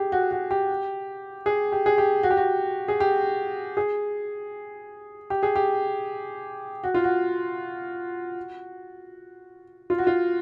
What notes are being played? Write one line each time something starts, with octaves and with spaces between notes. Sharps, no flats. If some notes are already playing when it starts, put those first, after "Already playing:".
Already playing: G4 G#4
F#4
F#4
G4
G#4
G4
G#4
G4
F#4
G4
F#4
G#4
G4
G#4
G4
G#4
G4
F#4
F4
F#4
F4
F#4
F4